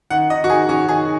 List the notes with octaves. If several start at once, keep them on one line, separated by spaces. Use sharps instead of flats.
D#3 F#5
D#3 D#5
F#4
D#3 G#4
C#4 F#4
D#3 G#4